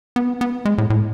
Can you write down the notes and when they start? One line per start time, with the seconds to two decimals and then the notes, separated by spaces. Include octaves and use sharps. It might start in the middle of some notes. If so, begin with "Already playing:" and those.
0.16 B3
0.41 B3
0.65 G#3
0.78 A2
0.90 A2